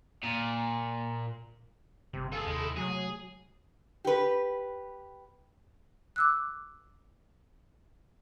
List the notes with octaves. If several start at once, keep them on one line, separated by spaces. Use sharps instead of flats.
A#2
G1 C3 G3 C4
F4 G#4 A4
D#2 C3 G#3 E4
C3 F#3 G#3 A3 G#4
G4 B4
D6 E6 F#6